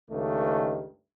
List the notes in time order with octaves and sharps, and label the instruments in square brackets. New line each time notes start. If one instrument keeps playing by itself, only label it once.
[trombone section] C#2 G2 D#3 A3